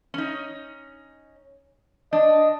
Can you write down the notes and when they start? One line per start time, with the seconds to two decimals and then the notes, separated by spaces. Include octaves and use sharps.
0.14 C#4 D#4
2.13 D4 D#5